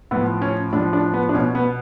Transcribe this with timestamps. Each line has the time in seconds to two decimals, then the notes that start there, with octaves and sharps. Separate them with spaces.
0.11 A2 F3 B3
0.42 C#4
0.73 A2 D4
0.76 F3
0.93 D4
1.14 B3
1.29 D4
1.34 B2 C#4
1.55 B3